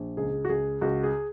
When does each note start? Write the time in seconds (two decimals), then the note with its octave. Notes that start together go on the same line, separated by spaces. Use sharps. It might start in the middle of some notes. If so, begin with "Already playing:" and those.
Already playing: A#1
0.17 C#2 G#4
0.45 F#4
0.49 C#2 G#4
0.81 C#2 F#4
1.03 G#4